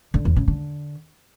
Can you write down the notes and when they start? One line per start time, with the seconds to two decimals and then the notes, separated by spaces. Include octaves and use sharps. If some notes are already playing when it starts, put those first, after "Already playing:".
0.14 D3
0.25 E2
0.36 C#3
0.48 D3